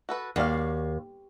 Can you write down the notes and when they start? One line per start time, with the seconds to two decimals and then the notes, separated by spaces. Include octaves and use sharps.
0.09 F#4 A4 B4
0.36 D#2 F#4 D5 F5